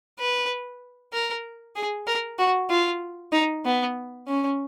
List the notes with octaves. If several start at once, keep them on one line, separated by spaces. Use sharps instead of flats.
B4
A#4
G#4
A#4
F#4
F4
D#4
B3
C#4